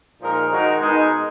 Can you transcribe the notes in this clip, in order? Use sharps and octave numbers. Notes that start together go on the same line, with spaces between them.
A#2 F3 G#3 D#4 A#4
D#3 G#3 D#4 F#4 A#4
B2 G#3 D#4 A#4